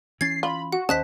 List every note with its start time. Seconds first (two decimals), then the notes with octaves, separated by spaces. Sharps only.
0.21 E3 C#4 G#6 A6 C7
0.43 F4 B5
0.72 F#4 F#5
0.89 D#2 D#3 C#4 C5 D#5 A5 F#6 B6